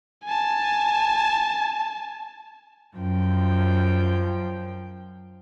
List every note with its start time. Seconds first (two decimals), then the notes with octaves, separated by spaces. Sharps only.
0.25 G#5 A5
2.96 F#2 F3 G5